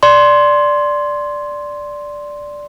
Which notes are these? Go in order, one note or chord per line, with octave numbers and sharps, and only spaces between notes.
D5 C6